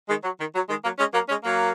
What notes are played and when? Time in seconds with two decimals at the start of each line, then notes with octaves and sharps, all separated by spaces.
0.09 D#3 G#3
0.23 F#3
0.40 D#3
0.55 F#3
0.69 D#3 G#3
0.84 F#3 A#3
0.99 G#3 C#4
1.14 F#3 A#3
1.29 G#3 C#4
1.44 F#3 A#3